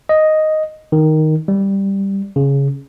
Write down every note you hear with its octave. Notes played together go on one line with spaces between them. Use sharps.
D#5
D#3
G3
C#3